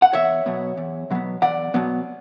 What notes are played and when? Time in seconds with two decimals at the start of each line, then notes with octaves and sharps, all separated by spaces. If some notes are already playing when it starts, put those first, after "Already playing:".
0.02 F#5
0.13 E2 C#5 E5
0.46 B2 F#3 B3
0.77 E2
1.11 B2 F#3 B3
1.42 E2 D5 F#5
1.74 B2 F#3 B3